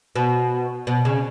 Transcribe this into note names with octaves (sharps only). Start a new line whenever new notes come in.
B2
B2
C#3